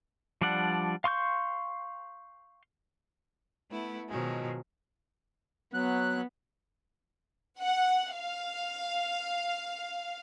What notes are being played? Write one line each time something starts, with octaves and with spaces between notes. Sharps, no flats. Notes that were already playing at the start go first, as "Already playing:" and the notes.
F3 G3 D4 D5 F#5
F5 C6 C#6 G6
A3 B3 E4
B2 D#3 F3 F#3 G#3
F#3 B3 F#6
F#5
F5